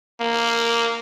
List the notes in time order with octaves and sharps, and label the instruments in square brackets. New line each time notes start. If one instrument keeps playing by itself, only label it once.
[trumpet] A#3